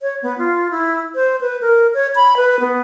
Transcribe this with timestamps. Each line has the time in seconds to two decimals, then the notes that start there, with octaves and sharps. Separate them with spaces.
0.01 C#5
0.22 B3
0.38 F4
0.71 E4
1.15 C5
1.41 B4
1.61 A#4
1.94 C#5
2.15 B5
2.37 B4
2.60 B3